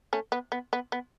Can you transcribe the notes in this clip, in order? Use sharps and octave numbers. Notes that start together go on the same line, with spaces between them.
A3 C#4
B3
B3
B3
B3